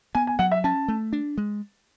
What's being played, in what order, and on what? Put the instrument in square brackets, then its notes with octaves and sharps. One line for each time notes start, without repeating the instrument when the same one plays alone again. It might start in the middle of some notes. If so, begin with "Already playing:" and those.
[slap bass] B3 [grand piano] G#5
[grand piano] G#5
[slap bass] F#3 [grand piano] F#5
[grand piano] E5
[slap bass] C#4 [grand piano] A5
[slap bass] A3
D4
G#3